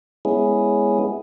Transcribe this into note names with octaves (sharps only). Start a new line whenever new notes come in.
G#3 B3 C#4 E4 G#4